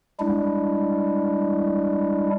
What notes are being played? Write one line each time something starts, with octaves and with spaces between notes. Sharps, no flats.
G3 G#3 D4 E4